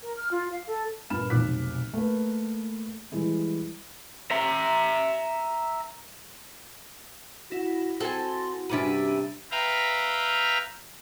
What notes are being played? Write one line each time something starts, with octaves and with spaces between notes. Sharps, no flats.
A#4
F6
F4
F5
A4
G2 A#2 B5 F6 E7
F1 B1 D6 F#6 B6
A3 A#3 B4
E3 G3 G#3 E4
E5 A#5
E4 F#4 A#6
C4 F#4 A4 C5 G#5
G2 C3 C#4 D4 B4 E5 D#7
B4 E5 F5 G5 A#5